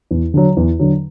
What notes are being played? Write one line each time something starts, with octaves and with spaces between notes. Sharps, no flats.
E2
D3 F#3
E2
D3 F#3